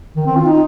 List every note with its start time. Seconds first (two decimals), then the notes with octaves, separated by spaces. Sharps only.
0.16 D#3
0.26 C4
0.36 F4
0.46 D#4